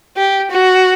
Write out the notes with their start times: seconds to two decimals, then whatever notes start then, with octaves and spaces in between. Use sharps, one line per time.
0.16 G4
0.51 F#4